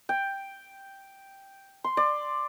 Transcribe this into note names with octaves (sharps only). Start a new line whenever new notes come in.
G5
C6
D5